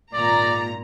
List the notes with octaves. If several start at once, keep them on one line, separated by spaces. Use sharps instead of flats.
G#1 A#2 D5 A#5